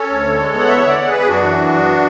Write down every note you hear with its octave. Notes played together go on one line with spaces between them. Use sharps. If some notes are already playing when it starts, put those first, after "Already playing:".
Already playing: C#4 A4 C#5
D2
D3
G#3
B3
F#5
E2 C#5 E5
D3 D5 F#5
G#3
B3 G#4 B4
G#4
F#2 D4 F#4
E3
B3
F#2